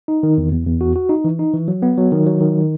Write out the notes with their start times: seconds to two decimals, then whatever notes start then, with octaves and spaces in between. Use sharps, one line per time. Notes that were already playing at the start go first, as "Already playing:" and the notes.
0.08 D#4
0.23 D#3
0.38 E2
0.52 E2
0.67 E2
0.81 F#4
0.96 F#4
1.09 D#4
1.24 E3
1.39 D#4
1.54 E3
1.68 F#3
1.82 B3
1.98 F#3
2.12 D#3
2.27 F#3
2.41 D#3